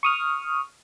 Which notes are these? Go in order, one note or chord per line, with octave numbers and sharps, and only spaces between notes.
C#6 D#6 F6